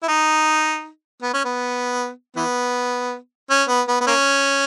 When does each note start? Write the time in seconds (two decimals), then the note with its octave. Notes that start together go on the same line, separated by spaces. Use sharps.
0.03 E4
0.08 D#4
1.22 B3
1.34 C#4
1.45 B3
2.36 E3 B3
3.50 C#4
3.69 B3
3.88 B3
4.01 B3
4.07 A#3 C#4